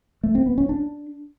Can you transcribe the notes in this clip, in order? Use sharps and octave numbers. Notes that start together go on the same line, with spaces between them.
A3
C4
B3
C#4
D4